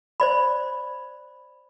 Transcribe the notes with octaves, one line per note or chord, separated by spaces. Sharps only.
C5 D5 B5